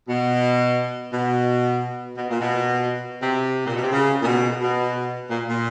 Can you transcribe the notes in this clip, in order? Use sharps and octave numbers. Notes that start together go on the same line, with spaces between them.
B2
B2
B2
A#2
B2
C3
A#2
B2
C3
C#3
A#2
B2
B2
A#2
A#2